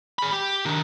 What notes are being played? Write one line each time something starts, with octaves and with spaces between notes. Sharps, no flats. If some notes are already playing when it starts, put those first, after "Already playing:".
G#4 B5
G4
D#3 D4